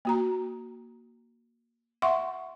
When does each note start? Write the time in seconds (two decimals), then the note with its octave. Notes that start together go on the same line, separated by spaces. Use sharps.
0.05 A#3 F#4 A#5
2.02 E5 F#5 C6 C#6